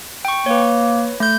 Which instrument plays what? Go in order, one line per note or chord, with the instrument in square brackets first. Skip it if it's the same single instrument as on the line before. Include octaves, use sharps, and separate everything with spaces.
[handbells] G5 C#6
[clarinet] A#3 [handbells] B4 C#5
[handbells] A3 G6